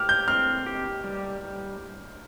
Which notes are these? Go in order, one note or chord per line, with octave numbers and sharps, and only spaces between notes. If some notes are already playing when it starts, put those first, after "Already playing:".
Already playing: G4 F6
G6
C4 F6
G4
G3